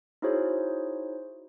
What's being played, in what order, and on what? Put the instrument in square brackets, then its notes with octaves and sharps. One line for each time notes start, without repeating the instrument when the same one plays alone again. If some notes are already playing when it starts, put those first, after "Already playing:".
[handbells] D#4 E4 F#4 G#4 C5 C#5